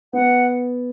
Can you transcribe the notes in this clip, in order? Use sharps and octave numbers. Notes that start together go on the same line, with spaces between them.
B3 F#5